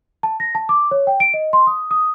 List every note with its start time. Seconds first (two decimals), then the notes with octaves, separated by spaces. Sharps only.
0.23 A5
0.40 A#6
0.55 A5
0.69 D6
0.91 C#5
1.07 G5
1.20 D7
1.34 D#5
1.53 C6
1.67 D#6
1.91 D#6